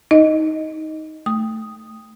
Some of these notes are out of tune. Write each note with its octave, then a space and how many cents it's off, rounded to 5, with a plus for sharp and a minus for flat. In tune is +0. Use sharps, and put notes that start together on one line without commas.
D#4 +15 D#5 +0
A3 +0 D#6 +0